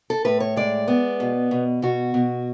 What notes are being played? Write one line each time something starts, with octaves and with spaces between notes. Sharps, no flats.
A4
A2 B4
C#5
G#3 D5
B3
B2
B2
B2 F#4
B2